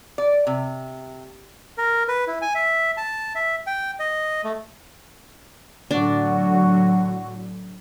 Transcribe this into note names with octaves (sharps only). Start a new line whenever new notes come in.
D5
C3
A#4
B4
E4
G#5
E5
A5
E5
G5
D#5
A3
A2 D3 F#3 D4 F#4